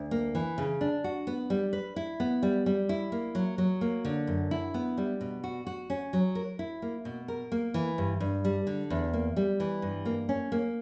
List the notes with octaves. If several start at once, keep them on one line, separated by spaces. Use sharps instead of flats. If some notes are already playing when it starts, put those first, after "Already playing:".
Already playing: D2
A#3
E3
C#3
D4
F#4
B3
G3
B4
E4
B3
G3
G3
E4
A#3
F#3
F#3
A#3
D3
F#2
E4
B3
G3
B2
F#4
F#4
C#4
F#3
A#4
E4
A#3
B2
A#4
A#3
E3
G2
G2
G3
D3
E2
A#3
G3
E3
G2
A#3
C#4
A#3